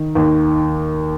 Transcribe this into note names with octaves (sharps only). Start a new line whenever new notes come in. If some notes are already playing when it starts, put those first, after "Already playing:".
Already playing: D#3
D#2